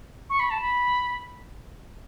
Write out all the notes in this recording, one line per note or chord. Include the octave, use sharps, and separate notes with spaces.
C#6
B5
A5
B5